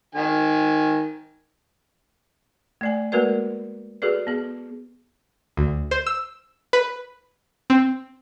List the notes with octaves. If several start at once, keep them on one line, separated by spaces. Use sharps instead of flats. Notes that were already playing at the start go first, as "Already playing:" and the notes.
D#3 G#5
A3 D5 G#5
G#3 A#3 F#4 A#4 B4 D5
F#4 G#4 A4 B4 D5
B3 G#4
D2
C5
E6
B4
C4